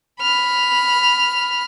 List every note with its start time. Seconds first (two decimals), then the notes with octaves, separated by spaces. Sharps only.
0.21 B5 F6